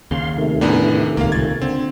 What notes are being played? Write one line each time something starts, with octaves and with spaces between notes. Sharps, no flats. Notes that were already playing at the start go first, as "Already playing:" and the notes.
D#2 C#3 F5 C6
C3 D#3 A3
E2 A2 B3 D4
D#1 C#2 A#3 F5
C#2 A#2 G#6 A6
D3 C4